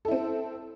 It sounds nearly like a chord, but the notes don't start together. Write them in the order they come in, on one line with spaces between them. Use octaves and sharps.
A4 E4 C4